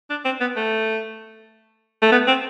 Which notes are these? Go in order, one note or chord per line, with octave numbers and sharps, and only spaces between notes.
D4
C4
B3
A3
A3
B3
C4